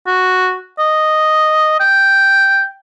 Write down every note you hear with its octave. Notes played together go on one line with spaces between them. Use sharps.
F#4
D#5
G5